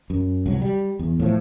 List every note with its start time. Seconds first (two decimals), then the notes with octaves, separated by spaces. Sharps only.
0.10 F#2
0.46 C2 F#3
0.62 G3
0.99 E2
1.20 A2 F3